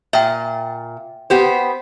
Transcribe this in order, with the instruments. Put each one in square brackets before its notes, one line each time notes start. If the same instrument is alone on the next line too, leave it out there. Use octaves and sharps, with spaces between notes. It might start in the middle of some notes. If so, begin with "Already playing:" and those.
[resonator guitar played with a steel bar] A#2 [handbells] E5 G5
[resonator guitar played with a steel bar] B3 G4 C5